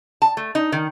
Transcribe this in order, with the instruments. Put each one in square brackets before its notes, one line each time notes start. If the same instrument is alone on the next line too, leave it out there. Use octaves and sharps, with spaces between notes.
[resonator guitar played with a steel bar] A5
A3
D#4
D#3